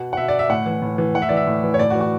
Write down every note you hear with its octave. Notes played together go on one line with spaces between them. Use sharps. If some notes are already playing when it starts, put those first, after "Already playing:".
Already playing: B2 F#5
F#5
B2 E5
D5
E5
A2 F#5
E3
A2
E3
A2 F#5
E5
E3 D5
E5
A2
E3
C#5
A2 D5
F#4
E3
F#4